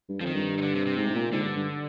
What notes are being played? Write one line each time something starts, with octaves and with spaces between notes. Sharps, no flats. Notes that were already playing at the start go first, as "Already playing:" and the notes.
G2
F2 F3
D#3
G2
D#3
D3
C3
C3
G#2
G#2
A#2
G#2 D3
G2
G2